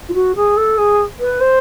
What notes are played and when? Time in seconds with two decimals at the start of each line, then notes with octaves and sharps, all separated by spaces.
0.09 F4
0.14 F#4
0.36 G#4
0.57 A4
0.78 G#4
1.20 B4
1.41 C5